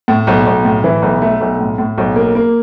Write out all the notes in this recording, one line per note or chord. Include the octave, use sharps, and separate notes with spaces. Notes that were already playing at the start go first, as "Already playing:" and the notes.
A2
B1
B1
A2
E3
B1
A3
B1
A2
A2
B1
A#3
A#3